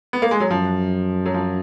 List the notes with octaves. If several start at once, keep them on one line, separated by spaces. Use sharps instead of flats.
B3
A#3
G#3
F#3
F#2 F3
F#3
F3